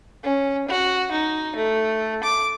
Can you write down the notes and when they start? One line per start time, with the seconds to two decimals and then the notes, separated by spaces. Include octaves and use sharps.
0.24 C#4
0.68 F#4
1.11 D#4
1.56 A3
2.23 D6